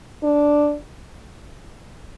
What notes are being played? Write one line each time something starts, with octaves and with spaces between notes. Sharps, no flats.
D4